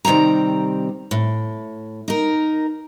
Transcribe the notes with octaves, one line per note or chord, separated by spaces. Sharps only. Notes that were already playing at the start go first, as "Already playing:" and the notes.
C3 D#3 G3 C4 A#5
A2
D#4 A#4